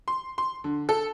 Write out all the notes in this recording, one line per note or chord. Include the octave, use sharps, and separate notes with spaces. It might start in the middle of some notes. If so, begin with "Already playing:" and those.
C6
C6
D3
A4